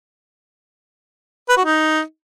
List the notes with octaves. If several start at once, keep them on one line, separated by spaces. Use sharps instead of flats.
B4
F#4
D#4